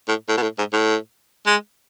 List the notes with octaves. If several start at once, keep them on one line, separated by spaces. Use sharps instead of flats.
A2
A2
B2
A2
G#2
A2
G#3